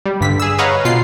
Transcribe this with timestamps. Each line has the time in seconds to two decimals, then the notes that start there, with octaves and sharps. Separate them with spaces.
0.06 G3
0.21 G2 D3 B6
0.40 G#4 E6
0.59 B4 C#5 D#5 F5 F#5 A#5
0.85 B2 F4 C7